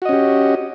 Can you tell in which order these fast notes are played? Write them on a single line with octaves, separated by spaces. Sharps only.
F#4 D#5 C#4 G4